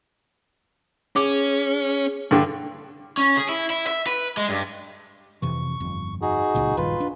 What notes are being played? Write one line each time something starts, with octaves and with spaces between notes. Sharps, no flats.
C#4 G#4 D6
G2 D3
C#4
G#4
E4
E4
E5
B4
G#3
G2
F2 C3 E3 C#6
G1 F2
D#4 F#4 G#4
D1 C#2 A#2
A#1 G2 D#3 F4 B4
D4